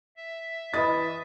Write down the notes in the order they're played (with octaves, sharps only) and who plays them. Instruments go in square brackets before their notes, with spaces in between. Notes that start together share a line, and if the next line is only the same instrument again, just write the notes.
[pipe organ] E5
[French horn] E3 [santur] D#5 [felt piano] B5 D#6 A6